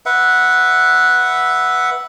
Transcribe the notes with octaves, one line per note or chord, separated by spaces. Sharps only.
B4 E5 F#5